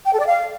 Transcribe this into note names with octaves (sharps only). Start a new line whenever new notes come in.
G5
A4
D5
F5